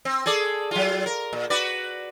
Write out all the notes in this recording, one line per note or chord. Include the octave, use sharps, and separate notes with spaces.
C4
G#4 A4 D5
F#3 F4
A#4
A#2
F#4 B4 D5